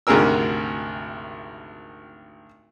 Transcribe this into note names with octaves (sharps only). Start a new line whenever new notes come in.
G#1 D2 C3 G#4 A#4 E6